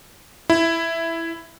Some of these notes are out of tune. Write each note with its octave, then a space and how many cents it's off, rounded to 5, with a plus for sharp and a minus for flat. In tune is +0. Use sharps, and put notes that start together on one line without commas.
E4 +5